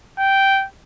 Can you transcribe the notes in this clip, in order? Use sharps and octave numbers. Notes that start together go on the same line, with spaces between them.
G5